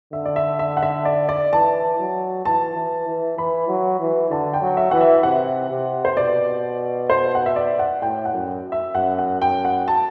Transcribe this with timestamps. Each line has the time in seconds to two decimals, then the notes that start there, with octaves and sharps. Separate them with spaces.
0.13 D3 E5
0.26 D5
0.36 E5
0.59 E5
0.77 F#5
0.83 E5
1.05 D5
1.29 D5
1.52 E3 A5
1.99 F#3
2.45 E3 A5
2.75 E3
3.07 E3
3.37 E3 B5
3.68 F#3
4.00 E3
4.30 D3 A5
4.54 G5
4.61 F#3
4.77 E5
4.91 E3 F#5
5.01 E5
5.23 C3 F#5
5.71 C3
6.05 C5
6.16 B2 D5
7.10 C5
7.35 F#5
7.46 E5
7.56 D5
7.79 F#5
8.02 A2 G5
8.25 F#5
8.34 F#2
8.72 E5
8.95 F#2 F#5
9.19 F#5
9.42 F#2 G5
9.65 F#5
9.88 A5